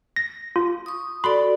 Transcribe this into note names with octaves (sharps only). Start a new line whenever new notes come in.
A#6
F4
C#6 D#6
F#4 A4 D5 B5 C6